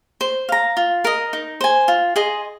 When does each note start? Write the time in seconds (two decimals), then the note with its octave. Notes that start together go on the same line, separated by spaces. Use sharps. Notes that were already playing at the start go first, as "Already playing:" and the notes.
0.21 C5
0.49 F5 A#5
0.77 F4
1.04 A#4 D#5
1.33 D#4
1.61 C5 G#5
1.88 F4
2.16 G#4 D#5 C6